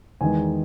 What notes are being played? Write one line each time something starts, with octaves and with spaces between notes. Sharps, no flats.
E2 D#3 G#3 D#4 G#5